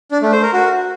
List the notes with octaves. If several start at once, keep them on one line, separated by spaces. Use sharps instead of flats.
D4
A3
C5
A#4
F#4